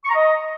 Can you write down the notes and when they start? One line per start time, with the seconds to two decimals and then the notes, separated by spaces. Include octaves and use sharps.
0.04 C#6
0.10 A#5
0.15 D#5